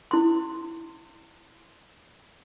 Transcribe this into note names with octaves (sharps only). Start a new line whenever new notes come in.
E4 C6